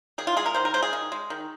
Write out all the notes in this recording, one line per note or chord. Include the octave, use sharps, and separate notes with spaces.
D#3 G#4
F4
G#3 G#4
A#4
D#3 C5
A#4
G#3 C5
G#4
D#3
G#3
D#3